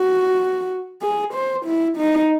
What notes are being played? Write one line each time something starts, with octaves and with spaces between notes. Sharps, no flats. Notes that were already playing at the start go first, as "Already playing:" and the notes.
Already playing: F#4
G#4
C5
E4
D#4